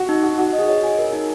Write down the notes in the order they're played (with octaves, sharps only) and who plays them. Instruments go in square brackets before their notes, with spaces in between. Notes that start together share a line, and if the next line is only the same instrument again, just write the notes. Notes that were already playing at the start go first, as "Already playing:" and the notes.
Already playing: [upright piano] F#4
[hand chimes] D#4
[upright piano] F#4 [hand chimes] F#5
[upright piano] F#4 [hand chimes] F#5
[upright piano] F#4
[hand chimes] D#5
[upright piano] G#4
[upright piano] C#5 [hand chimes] D#5
[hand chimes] G#5
A#4
D#4